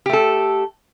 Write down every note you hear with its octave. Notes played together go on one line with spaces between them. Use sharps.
A3 G4 A4